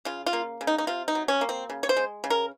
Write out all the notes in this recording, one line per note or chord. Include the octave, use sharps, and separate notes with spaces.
C#3 F4
F4
A#3
C#3
D#4
D#4
C3 F4
D#4
F#3
C#4
A#3
C4
C#3
C#5
C5
G#3
C#3
A#4